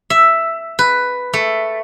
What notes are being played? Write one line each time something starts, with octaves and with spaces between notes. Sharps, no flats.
E5
B4
A3